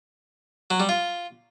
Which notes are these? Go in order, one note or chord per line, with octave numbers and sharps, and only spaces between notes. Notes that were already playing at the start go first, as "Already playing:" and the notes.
F#3
G3
F4